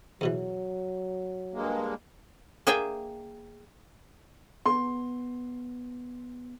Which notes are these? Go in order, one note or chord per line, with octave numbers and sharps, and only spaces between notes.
E2 B2 E3 F#3
G2 G#3 A#3
A#3 G#4 D5 E5 G5 G#5
B3 C6